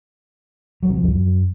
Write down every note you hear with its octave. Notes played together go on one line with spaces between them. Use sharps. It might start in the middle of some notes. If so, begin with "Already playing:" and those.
F#3
C3
F3
F2
F#2